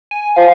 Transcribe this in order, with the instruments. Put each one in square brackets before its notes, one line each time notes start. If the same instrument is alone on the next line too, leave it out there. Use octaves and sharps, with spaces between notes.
[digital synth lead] G#5
[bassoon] F3 [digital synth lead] F5